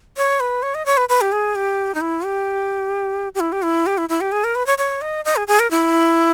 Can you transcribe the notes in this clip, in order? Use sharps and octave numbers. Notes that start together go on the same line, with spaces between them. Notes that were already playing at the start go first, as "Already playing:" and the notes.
C#5
B4
C#5
D#5
C#5
B4
B4
G4
G#4
G4
D#4
E4
G4
G4
E4
G4
E4
G4
E4
E4
G4
G#4
A#4
B4
C#5
C#5
D#5
D#5
G#4
G#4
A#4
E4